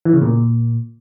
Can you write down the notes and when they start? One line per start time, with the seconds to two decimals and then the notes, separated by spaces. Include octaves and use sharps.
0.05 E3
0.14 C#3
0.22 A#2